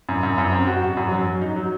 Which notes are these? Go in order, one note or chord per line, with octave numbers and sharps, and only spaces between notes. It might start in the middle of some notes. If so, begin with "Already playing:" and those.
F#2
F#2
F#2
C4
F#4
F#4
F#2
F#3
F#3
D#4
F#3